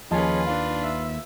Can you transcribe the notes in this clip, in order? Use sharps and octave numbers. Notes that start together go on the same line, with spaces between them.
D#2 F3 C#4 F4 G#4 B4 D#5 A5
D4 F5
E5